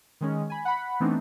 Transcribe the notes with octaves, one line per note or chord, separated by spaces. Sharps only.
D#3 G#3 C#4 G#4
G#5 B5
F#5 B5
E3 A3 B3 C4 D4 D#4